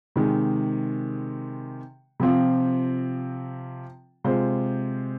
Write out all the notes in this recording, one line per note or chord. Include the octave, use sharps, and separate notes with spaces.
C3 D#3 G#3
C3 F3 C4 F4
C3 G#3 F4 C5